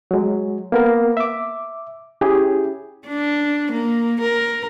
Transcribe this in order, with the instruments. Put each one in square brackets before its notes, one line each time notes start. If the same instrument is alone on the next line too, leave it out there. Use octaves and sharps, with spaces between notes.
[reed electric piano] F#3 G#3
A#3 B3 A#4
E5 D6
C#4 E4 G4 G#4
[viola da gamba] D4
A#3
A#4